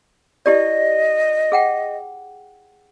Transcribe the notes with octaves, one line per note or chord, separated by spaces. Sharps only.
E4 G4 D5 D#5
G#4 F#5 G5